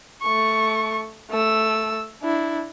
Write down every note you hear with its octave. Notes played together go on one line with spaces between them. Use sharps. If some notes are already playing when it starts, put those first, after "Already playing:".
A3 C#6
A3 E6
D4 E4